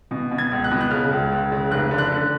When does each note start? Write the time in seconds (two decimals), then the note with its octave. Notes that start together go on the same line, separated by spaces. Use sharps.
0.11 B2
0.31 B2
0.38 G#6
0.52 C#2
0.64 F#6
0.71 B2
0.81 F#6
0.91 C#3 F6
1.11 C#2
1.32 C#2
1.52 C#3
1.71 F1 F#6
1.91 D3
1.98 F#6
2.12 D3